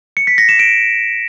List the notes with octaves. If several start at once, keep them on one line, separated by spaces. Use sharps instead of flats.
C#7
B6
A#6
E7
D7